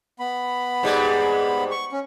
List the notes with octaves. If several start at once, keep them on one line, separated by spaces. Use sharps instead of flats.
B3 B5
G#2 G3 G#3
C#6
C#4